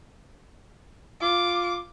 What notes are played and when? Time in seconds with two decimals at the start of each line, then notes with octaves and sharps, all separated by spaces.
1.22 F4 D6